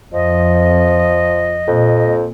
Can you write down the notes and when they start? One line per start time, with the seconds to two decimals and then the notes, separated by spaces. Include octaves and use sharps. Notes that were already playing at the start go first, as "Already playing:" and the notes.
0.13 F2 F3 D#5
1.67 F2 A#2